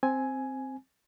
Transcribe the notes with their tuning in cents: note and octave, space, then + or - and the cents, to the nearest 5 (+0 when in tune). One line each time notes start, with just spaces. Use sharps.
C4 +5 G#5 +10